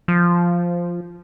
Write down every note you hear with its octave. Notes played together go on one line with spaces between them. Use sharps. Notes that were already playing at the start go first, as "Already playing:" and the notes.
F3